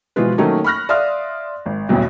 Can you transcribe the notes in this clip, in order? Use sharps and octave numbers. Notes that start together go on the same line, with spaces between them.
B2 E3 F3 G#3 F4 B4
D#3 F#3 A3 A#3 C#4 D#4
B5 C#6 F6 F#6 A#6
D5 E5 F5 C6 D#6 F6
G#1
A1 E2 G2 B2